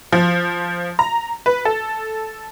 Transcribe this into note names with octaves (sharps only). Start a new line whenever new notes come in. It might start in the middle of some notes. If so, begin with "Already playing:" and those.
F3
A#5
B4
A4